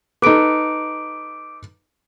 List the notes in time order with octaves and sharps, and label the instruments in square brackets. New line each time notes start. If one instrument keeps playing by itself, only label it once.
[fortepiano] D#4 A4 B4 [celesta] D6 D7